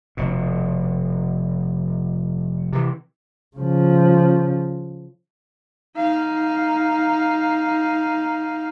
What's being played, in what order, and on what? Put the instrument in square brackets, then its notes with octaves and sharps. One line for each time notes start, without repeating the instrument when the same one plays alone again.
[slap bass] F1 B2
C3 E3
[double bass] C#3 F3
[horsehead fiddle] D#4 F5